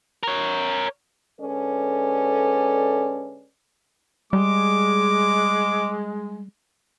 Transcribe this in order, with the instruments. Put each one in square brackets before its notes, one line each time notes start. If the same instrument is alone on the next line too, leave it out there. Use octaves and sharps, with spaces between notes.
[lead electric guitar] A#4 C#5
[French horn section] D3 G#3 C#4 A4 B4 D5
[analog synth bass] G3 [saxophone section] G#3 [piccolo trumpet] D6